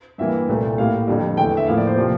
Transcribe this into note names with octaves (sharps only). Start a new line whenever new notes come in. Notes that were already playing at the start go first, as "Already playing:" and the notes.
G2 E3 A#3 E5
C2 A#2 A3
A2 G3 A#3 F5
F2 D3 G3
E2 D3 A3 G5
E5
A2 F3 A#3 F5
D5
C5
C3 F3 A#3 D5